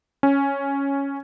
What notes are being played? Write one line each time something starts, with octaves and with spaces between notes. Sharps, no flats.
C#4